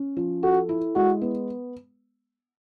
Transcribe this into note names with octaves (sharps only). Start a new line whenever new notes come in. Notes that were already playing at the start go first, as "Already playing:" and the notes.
Already playing: C#4
F3
F#4 A4
E4
G#3 F#4
B3